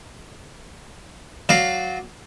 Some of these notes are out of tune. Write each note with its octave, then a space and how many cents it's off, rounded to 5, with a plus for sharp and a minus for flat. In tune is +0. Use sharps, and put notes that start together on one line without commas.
F#3 +0 D5 +0 F5 +0